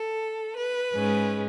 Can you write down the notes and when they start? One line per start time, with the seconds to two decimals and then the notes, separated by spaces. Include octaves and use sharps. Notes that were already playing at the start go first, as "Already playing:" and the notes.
Already playing: A4
0.57 B4
0.92 G#2 G#3 C#4